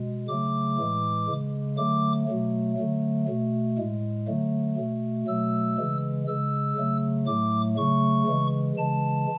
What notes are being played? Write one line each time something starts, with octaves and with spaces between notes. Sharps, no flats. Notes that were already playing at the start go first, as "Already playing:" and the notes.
Already playing: B2 G#3
C#3 F#3 A3 D6
A2 E3 G#3
C#3 G#3
D3 F#3 A3 D6
B2 F#3 A3
D3 F#3 A3
B2 A3
A2 G#3
D3 F#3 A3
B2 A3
B2 F#3 A3 E6
C#3 E3 G#3
C#3 G#3 E6
C#3 F#3 A3
A2 F#3 A3 D6
C#3 F#3 A3 C#6
C#3 E3 G#3
C#3 E3 G#3 A5